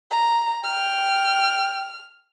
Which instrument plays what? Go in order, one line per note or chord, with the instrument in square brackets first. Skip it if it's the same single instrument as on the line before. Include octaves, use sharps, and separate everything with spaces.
[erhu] A#5
[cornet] G5 [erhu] F6